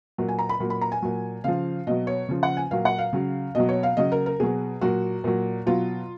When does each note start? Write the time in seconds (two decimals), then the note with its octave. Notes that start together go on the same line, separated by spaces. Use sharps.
0.18 A#2 F#3
0.28 G#5
0.39 A#5
0.49 B5
0.60 A#2 F#3
0.70 B5
0.81 A#5
0.92 G#5
1.02 A#2 F#3
1.44 C#3 F3 F5
1.87 B2 F#3 D#5
2.07 C#5
2.29 C#3 F3
2.43 F#5
2.57 G#5
2.71 A#2 F#3 F5
2.85 F#5
2.98 F5
3.13 C#3 F#3
3.55 B2 F#3 D#5
3.69 C#5
3.83 F5
3.97 C#3 F#3 D#5
4.12 A#4
4.26 A#4
4.40 B2 F#3 G#4
4.81 A#2 F#3 F#4
5.24 A#2 F#3
5.66 B2 F#3 F4